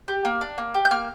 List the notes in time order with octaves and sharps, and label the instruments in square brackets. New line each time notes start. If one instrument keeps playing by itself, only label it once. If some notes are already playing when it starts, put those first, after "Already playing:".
[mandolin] G4
A#3
D4
A#3
G4
G6
A#3 F6